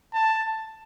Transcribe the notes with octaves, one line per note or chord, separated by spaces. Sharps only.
A5